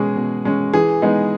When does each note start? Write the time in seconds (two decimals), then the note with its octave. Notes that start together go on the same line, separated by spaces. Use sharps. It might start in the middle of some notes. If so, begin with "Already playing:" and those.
Already playing: B2 G#3 C#4 G#4
0.16 B2
0.45 G#3 C#4
0.73 E3 G#4
1.02 G#3 B3 D#4